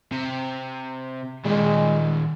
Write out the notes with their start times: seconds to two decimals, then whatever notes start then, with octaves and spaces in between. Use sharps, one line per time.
0.12 C3
1.45 D#2 A#2 G#3